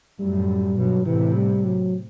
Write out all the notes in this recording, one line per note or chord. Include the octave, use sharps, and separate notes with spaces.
F#2 A2 G3
G2 B2 F#3
A2 C3 E3
G3
F#3